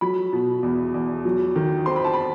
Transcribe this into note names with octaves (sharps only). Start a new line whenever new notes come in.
F#3 B5
B2
E2
E2
F#3
D#3
C4 C6
B5
A5
B5